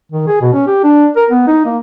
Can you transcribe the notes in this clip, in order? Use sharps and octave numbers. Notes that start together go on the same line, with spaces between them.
D#3
G#4
B2
C#4
G4
D4
A#4
B3
D#4
A#3